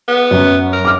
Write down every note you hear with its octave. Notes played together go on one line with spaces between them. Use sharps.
B3
F#2
A#4
D6 F6